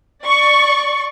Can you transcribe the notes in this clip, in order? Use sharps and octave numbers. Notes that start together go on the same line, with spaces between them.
D5 C#6